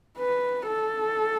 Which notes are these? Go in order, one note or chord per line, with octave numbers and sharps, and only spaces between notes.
B4
A4